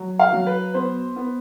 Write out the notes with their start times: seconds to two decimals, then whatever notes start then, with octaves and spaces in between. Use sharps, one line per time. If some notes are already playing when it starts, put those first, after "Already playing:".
Already playing: F#3
0.19 F5
0.32 F#3
0.46 B4
0.74 B3 C5
1.16 B3